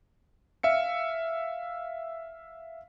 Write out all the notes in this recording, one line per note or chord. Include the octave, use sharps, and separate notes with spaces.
E5 F5 C#7